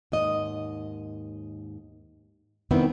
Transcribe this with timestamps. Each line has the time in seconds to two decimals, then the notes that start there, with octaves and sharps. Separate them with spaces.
0.12 D#2 G#2 D#5
2.71 C3 D#3 G3 B3 C4 E4